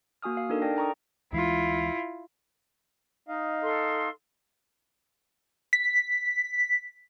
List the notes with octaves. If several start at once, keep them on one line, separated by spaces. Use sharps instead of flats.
A#3 F#4 G#5 D#6 F6
F5
D4 D#4 A4 A#4
A4 D5 G5 A#6
G5 A#5 C#6 D#6
D2 E3 G#3 E4 F4
D#4 D#5 F5
A4 C6
B6